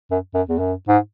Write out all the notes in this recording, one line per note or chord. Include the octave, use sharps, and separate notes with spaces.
F#2
F#2
E2
F#2
G#2